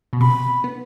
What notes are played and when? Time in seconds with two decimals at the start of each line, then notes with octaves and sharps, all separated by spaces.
0.13 B2
0.21 C3 B5
0.64 B3